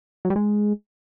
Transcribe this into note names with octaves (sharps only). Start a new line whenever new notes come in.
F#3
G3
G#3